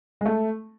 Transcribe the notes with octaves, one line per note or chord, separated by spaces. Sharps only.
G#3
A3